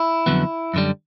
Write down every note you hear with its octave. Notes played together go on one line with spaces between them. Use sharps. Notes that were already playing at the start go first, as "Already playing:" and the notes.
Already playing: E4
F2 D3 F#3 B3
F#2 D3 G3